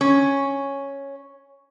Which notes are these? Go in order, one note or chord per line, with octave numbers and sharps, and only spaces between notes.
C#4